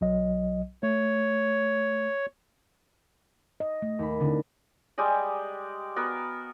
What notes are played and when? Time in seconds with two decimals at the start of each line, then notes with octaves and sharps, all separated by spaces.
0.01 B1 F#3 D#5
0.83 A3 C#5
3.60 D#5
3.82 A3
3.99 D#2 B5
4.20 D3 C4 D4 E4
4.98 G3 G#3 G4 D#5
5.96 B3 F#4 A#4 B4